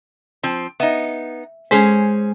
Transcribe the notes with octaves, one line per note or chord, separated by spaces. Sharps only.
F3 C4
B3 D#4 E5
G#3 C#4 G#4 C5